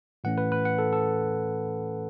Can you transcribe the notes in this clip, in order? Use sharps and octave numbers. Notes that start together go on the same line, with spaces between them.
A2 E3 A3 C#4 F#5
B4
B4
F#5
A4
A4